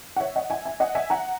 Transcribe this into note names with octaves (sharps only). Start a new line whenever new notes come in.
F#5
C#5 E5
D#5 F#5
E5 G#5
E5 G#5
D#5 F#5
E5 G#5
F#5 A#5